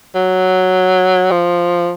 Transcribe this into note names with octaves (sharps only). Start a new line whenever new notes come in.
F#3
F3